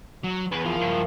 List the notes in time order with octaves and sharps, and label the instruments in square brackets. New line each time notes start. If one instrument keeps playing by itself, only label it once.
[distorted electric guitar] F#3
[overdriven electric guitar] E2 [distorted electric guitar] B4 [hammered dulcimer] C#5
[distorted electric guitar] F3 [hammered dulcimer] A#3 E4
[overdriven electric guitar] C#2 G2